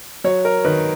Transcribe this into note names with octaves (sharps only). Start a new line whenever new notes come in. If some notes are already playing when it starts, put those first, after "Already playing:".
F#3 C#5
A#4
D#3 B4